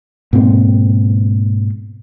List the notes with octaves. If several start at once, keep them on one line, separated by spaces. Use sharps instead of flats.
G#2 B2 A#3 C4